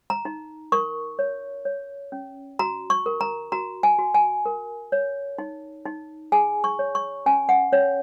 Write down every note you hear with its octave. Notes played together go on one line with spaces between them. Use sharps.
A#5
D#4
A#4 C#6
C#5
C#5
C#4
F#4 A#5
C#6
A#4
A#5
F#4 A#5
G#5
F#4
G#5
A#4
C#5
D#4
D#4
G#4 G#5
C#6
C#5
C#6
C#4 G#5
F#5
C#4 C#5